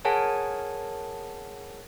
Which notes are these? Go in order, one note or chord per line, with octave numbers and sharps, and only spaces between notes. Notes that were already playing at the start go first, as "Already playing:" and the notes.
G#4 A#4 C#5 F#5 G#5 A5